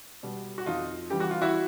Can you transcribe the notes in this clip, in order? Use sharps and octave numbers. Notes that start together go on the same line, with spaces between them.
B2 G3
F#4
F2 D#4 F4
C#3 E3 G3 G4
F#4
F4
E4 F#4